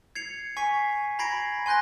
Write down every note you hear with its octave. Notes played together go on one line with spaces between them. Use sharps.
G#6 C7 C#7 F7
G#5 C#6 B6 C7
A#5 B5 G#6 A#6 C7 D7
G#5 C6 F#6 G6 A#6